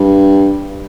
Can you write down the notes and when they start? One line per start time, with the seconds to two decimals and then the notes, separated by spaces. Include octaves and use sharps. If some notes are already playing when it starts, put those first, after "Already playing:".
Already playing: G2